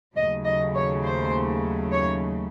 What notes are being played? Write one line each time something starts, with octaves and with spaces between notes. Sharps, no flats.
D#2 C#3 F#3 A3 D#5
D#5
C#5
C5
C#5